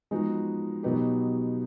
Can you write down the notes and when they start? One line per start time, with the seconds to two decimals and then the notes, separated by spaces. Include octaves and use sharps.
0.11 F3 G#3 B3 D#4 F#4
0.83 B2 F#3 B3 D#4 G4